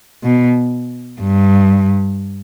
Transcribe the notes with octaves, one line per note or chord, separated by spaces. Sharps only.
B2
G2